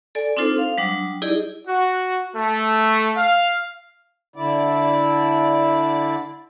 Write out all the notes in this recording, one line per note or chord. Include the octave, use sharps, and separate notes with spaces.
A4 D5 G#5
C4 D4 D#4 F4 A4 C5
F5
F#3 G3 D4 D#6
D#4 E4 G4 G#4 D5 D#5
F#4
A3
F5
D3 E4 D5